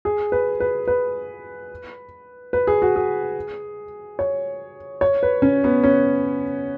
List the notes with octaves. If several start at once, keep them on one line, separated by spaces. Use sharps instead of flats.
G#4
B4
B4
B4
B4
G#4
F#4
G#4
C#5
C#5
B4
C#4
B3
C#4